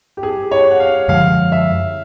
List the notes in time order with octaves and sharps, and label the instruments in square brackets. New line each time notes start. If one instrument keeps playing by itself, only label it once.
[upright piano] G4
G#4
C#5
F#5
F5
[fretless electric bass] F#2 D3 F3 G#3 [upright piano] F5
[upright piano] E5